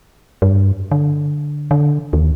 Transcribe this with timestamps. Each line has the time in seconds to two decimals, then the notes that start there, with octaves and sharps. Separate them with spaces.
0.42 G2
0.91 D3
1.71 D3
2.13 D#2